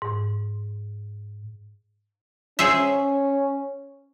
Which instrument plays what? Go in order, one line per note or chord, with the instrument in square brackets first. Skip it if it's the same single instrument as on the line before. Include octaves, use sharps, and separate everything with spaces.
[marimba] G#2
[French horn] C#4 [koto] G#4 C5 E5